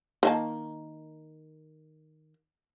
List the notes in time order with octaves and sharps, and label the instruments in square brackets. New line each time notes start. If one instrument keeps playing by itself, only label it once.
[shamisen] D#3 A#3 A5